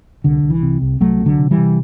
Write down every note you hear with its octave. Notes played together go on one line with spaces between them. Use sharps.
C2 D3
C2
E3
C3
C2
C2 F#3 A3
C3
D3 F#3
C3
E3 G3
C3